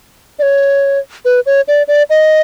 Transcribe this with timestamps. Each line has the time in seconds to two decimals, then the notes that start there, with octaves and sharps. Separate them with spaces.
0.39 D5
0.42 C#5
1.25 B4
1.46 C#5
1.68 D5
1.88 D5
2.10 D#5